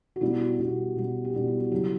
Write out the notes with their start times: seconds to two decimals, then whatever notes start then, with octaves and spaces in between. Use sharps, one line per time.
0.16 F#4
0.21 B2 G3 B3 E4 G4
0.40 F#4
0.51 E4
0.59 B2 G3 B3 F#4
0.97 B2 G3 B3
1.24 G4
1.34 B2 G3 B3 F#4
1.48 E4
1.59 F#4
1.71 C#3 F#3 E4 G4